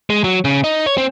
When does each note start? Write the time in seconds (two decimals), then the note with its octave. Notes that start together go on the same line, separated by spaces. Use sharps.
0.10 G#3
0.24 F#3
0.45 C#3
0.64 D#4
0.86 C#5
0.98 C4